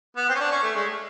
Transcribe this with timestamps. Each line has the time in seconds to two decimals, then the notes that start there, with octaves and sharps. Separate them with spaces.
0.17 B3
0.29 C4
0.35 C#4
0.40 D4
0.51 C#4
0.62 A3
0.75 G#3